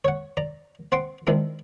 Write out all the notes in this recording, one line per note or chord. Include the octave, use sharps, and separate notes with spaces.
C#5 F#5
D5 A#5
C4 F#5 C6 D6
D#3 G#3 C4 D4 E4